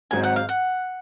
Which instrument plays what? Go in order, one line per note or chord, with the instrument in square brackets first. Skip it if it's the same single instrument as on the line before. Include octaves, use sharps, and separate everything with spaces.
[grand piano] G#1 G#2 F#3 C4 [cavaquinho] G#5
[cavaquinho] F#5
F5
F#5